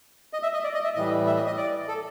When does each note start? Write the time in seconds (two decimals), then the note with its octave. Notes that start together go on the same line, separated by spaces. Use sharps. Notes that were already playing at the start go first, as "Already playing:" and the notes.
0.33 D#5
0.43 E5
0.54 D#5
0.64 D5
0.74 D#5
0.84 E5
0.95 A2 E3 G3 D#5
1.27 E5
1.36 D#5
1.47 D#5
1.57 D5
1.88 A4